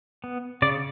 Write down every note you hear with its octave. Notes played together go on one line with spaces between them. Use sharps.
B3
C#3 D5